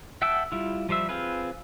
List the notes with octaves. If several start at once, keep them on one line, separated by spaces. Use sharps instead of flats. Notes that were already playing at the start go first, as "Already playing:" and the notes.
E5 F#5 G5 A5 E6
G3 E4 F4
F3 G3 C5 E5
C4 F4 G#4 B4